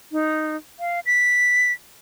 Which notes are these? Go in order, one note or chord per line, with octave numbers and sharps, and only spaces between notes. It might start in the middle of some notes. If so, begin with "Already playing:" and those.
D#4
F5
B6